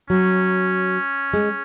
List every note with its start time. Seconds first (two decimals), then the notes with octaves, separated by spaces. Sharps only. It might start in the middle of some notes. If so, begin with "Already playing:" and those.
0.09 F#3 C#4
1.34 G#3